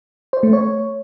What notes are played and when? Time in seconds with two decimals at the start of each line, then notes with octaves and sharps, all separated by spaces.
0.33 C5
0.43 A3
0.53 C#5